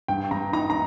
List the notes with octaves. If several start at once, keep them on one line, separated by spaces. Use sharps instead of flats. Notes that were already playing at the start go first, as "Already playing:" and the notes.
G2 G5
G2 A#5
D#4 A#5
A#5